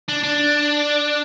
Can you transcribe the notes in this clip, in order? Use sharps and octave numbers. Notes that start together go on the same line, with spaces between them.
D4
D4